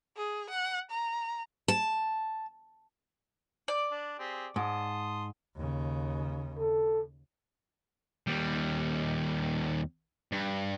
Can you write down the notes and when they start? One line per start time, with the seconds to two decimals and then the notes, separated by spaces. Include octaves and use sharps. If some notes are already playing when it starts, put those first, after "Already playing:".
0.17 G#4
0.50 F#5
0.90 A#5
1.68 A5
3.68 D5
3.92 D4
4.19 C4 G4 G#4
4.56 G#2 A5 C6 D#6
5.57 D#2 C#3
6.59 A4
8.27 D#2 G3
10.32 G2